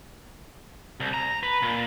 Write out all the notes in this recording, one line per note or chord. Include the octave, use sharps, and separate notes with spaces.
C2
A#5
B4
A#2